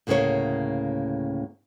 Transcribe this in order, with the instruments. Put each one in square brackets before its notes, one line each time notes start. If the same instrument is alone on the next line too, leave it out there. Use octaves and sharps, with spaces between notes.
[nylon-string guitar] D2 A2 C#3 E3 A#3 C#5